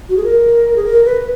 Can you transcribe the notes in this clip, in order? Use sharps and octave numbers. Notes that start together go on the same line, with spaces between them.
F#4
G#4
A#4
G#4
A#4
B4